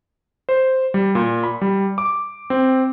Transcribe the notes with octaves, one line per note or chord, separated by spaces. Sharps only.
C5
G3
A#2
B5
G3
D6
C4